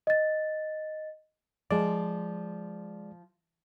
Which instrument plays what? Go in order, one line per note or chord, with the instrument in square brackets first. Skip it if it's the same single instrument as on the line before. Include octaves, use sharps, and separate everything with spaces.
[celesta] D#5 A6
[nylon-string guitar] F3 [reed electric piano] G#3 D5